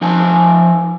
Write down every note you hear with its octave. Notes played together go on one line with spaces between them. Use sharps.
F3 D#4 G#5 A5